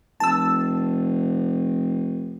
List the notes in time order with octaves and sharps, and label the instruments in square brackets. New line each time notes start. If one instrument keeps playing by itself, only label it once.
[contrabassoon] F1 [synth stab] A5 E6